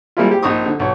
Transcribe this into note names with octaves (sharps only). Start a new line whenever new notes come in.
G3 G#3 A#3 C4 E4 F4
C4 G4
A#1 C4 D#4 C#6 D#6
D3
B1 C#5